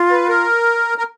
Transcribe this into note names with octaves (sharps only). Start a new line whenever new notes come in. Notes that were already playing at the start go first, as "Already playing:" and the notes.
Already playing: F4
B4
A#4
A#4